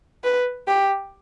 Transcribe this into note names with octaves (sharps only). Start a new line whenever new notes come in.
B4
G4